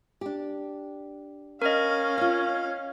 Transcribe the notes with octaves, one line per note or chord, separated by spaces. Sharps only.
D4 G4
C#4 A#4 D#5 F5
F4 C#5